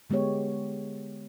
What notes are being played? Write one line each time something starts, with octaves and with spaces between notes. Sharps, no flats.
D3 G#3 B3 G4 C#5